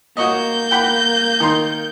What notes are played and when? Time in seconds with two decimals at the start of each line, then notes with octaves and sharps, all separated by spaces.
0.17 A#3 F#4 C#5 D#5 G6
0.71 F#5 G5 B5
1.40 D#3 C6